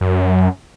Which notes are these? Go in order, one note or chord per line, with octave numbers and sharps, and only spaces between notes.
F#2